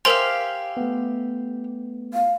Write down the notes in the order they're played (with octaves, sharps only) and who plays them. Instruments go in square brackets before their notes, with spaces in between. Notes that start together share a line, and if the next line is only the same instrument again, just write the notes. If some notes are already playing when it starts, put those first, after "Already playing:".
[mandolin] G4 E5 F5 [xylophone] A#4 C5 C6 [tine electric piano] G#5
[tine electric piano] A3 B3
[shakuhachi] F5